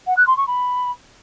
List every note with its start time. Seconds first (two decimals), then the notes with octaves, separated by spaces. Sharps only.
0.07 F#5
0.17 F#6
0.27 C6
0.37 C#6
0.47 B5